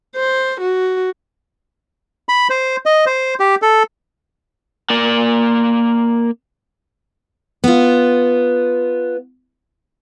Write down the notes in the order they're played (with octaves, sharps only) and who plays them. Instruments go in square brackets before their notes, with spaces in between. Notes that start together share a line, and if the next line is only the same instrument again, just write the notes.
[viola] C5
F#4
[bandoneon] B5
C5
D#5
C5
G4
A4
[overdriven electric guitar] A#3 D5
[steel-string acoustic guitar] B3 F4